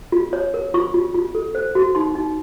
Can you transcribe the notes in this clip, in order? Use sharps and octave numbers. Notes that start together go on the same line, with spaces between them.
F4
C#5
A#4
F4 C#6
F4
F4
A4
C5
F#4
D#4 C6
D#4